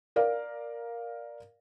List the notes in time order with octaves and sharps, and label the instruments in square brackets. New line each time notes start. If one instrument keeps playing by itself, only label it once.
[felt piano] A#4 D5 F5